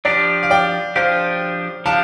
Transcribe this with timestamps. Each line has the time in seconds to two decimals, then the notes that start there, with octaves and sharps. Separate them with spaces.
0.05 F3 D4 G4 D5
0.43 F5
0.50 D5 G5
0.96 F3 D4 G4 C5 F5
1.86 F3 D4 G4 F5 A5